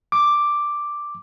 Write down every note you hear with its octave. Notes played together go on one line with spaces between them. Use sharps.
D6